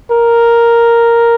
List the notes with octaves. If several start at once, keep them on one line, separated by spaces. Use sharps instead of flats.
A#4